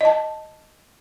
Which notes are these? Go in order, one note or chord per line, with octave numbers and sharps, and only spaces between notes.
D#5 A5